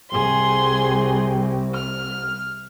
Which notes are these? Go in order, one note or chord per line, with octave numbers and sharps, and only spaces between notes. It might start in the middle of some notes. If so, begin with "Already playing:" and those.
C2 G#4 C6
F6